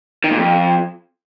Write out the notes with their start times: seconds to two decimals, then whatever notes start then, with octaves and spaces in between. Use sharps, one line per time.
0.24 D#3
0.31 A#2
0.38 F2